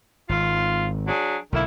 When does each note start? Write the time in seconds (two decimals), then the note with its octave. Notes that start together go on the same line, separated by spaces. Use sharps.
0.29 G#1 F4
1.07 F#3 D4 G#4
1.52 B1 D3 D#3 A#3 E4